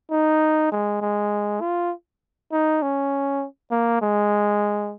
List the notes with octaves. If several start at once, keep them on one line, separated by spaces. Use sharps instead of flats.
D#4
G#3
G#3
F4
D#4
C#4
A#3
G#3